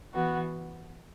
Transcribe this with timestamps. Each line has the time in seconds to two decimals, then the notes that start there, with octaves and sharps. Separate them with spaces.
0.13 E3 B3 F#4